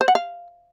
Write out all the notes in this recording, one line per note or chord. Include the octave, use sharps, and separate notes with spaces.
C5
F#5
F5